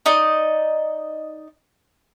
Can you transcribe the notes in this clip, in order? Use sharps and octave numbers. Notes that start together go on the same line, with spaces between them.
D#4 D5 D#5